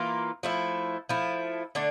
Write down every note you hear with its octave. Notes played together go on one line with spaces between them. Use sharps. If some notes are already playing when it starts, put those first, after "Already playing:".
Already playing: E3 A#3 F4
F3 A3 E4
F3 A3 E4
D3 A3 D4